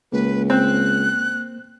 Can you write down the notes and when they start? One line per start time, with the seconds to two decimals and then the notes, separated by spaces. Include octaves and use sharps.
0.12 C#2 A#3 B4
0.50 C4 F#6